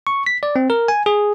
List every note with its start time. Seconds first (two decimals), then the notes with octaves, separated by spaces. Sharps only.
0.07 C#6
0.26 B6
0.43 D5
0.56 C4
0.70 A#4
0.88 G#5
1.06 G#4